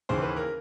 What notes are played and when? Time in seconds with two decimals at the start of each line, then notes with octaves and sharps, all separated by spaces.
0.09 D#2 C#3 E3 C5
0.22 B4
0.36 A#4